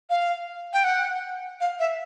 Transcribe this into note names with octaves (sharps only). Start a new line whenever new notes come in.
F5
G5
F#5
F5
E5